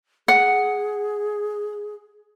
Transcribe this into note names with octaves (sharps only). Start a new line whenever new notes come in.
G#4 F#5